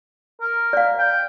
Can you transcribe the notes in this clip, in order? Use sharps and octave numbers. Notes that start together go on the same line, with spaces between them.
A#4
D5 F5
G5